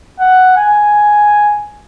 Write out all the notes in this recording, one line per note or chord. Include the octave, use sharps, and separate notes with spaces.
F#5
G#5